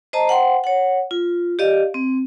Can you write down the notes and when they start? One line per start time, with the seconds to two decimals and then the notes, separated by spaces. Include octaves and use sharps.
0.13 C5 D#5 A5 A#5
0.28 C5 F#5 G5 C6
0.64 C#5 F#5
1.11 F4
1.59 G4 D5 D#5 F5
1.94 C4